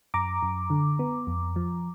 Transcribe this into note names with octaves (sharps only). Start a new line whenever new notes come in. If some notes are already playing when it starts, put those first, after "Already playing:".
F#2 A#5 D6
F#2
D3
B3
F2
F3